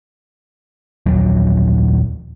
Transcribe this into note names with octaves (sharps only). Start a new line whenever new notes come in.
A#1 D#2 F#3